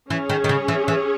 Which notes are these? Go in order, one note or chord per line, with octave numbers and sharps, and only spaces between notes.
E3 C#4 G#4 C#5
D#3
D#3
C#3
E3
E3